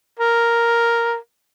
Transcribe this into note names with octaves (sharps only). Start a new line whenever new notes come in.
A#4